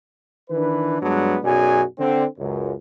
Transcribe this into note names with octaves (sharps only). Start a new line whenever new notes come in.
D#3 E3 D4 B4
G2 F#3 G#3 B3 D4
B1 F#2 F#4 G#4 D5 G#5
D3 C4
C#2 F#2